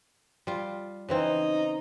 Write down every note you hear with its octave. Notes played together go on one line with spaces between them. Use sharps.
G3 F4
C#3 E3 C4 D#4